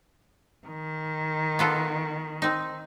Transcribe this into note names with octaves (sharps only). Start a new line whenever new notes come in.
D#3
B3 F4 A4
C4 D#4